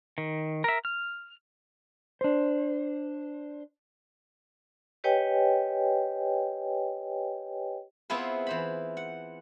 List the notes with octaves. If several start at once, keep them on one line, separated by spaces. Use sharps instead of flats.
D#3
A#4 E5
F6
D4 C5
G4 B4 C#5 D#5 G5 G#5
B3 C4 E4 F4 G#4 B4
E3 C5 B5
F#5